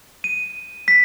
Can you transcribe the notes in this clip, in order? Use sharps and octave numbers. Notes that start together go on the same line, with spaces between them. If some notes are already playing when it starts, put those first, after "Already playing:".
D#7
B6